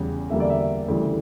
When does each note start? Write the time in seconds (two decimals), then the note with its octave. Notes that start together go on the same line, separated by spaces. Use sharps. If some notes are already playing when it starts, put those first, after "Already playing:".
Already playing: E2 C#3 G3
0.30 E2 D3 G3 A#3 E5
0.40 D5
0.50 E5
0.88 D2 C#3 E3 G3